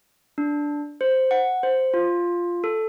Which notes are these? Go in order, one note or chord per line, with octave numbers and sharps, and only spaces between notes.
D4
C5
F#5
C5
F4
A4